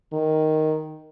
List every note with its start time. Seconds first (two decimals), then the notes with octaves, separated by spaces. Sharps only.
0.13 D#3